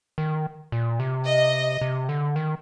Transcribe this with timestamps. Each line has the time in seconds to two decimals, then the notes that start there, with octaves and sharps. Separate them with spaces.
0.18 D#3
0.72 A#2
1.00 C3
1.26 D#5
1.81 C3
2.09 D3
2.36 D#3